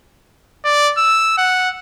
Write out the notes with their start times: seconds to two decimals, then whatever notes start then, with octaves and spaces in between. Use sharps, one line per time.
0.65 D5
0.97 E6
1.38 F#5